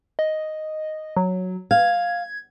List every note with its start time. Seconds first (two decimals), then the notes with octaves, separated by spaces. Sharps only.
0.19 D#5
1.16 F#3
1.71 F5 G#6